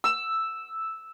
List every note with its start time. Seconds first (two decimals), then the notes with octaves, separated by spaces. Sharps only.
0.04 E6